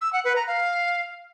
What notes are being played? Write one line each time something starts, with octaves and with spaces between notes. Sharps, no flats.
E6
F#5
B4
A#5
F5